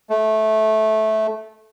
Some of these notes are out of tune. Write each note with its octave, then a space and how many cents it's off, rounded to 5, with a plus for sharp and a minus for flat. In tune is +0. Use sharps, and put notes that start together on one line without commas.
A3 -15